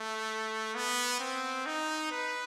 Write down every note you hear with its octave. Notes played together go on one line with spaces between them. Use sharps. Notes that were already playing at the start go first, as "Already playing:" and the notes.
Already playing: A3
B3
C4
D#4
B4